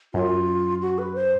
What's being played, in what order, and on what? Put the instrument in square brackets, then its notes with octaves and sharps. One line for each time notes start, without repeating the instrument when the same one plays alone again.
[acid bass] F#2 [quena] F4
[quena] F#4
B4
C5